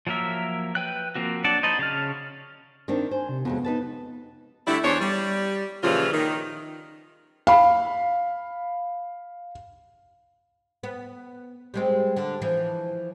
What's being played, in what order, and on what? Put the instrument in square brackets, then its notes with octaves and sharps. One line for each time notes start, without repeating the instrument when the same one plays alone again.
[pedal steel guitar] F3 F#3 A#3 A#4 E5
B4 G5 F#6
F3 A#3 C4 F#4
F#3 D4 D5 F#5 A5
D#4 C5 D#5 A5 B5
C#3 C#5 A5 F6
[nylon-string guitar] D#3 C4 D4
[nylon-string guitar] C5 [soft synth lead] G#5
[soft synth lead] C3
[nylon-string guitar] F2 F#3 G#3 [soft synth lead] B3
[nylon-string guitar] D#4 B4 A5
[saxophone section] D3 G3 A3 E4
E2 D4 C5 C#5
G3
A#2 C#3 E3 F3 G3 F4
D#3
[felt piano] F5 B5
[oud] B3
G3 G#3 C4
D3
E3 F3